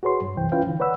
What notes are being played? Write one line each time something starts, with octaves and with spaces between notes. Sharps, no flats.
F#4 G#4 B4 C#5 C6
G2
C2 F#2 E3 C5 G5
C#4 E4 F4 B4 F5 G5
D3 E3
B4 C#5 D5 F#5 B5 E6